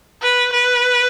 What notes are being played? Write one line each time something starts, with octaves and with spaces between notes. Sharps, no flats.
B4
B4